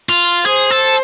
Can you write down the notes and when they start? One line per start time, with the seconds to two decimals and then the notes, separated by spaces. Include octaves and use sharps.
0.09 F4
0.46 G#4 C5
0.71 A4